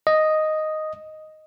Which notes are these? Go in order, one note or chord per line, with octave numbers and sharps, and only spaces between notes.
D#5